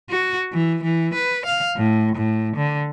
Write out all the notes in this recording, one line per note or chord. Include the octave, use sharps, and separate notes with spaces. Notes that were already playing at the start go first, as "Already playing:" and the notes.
F#4
E3
E3
B4
F5
A2
A2
D3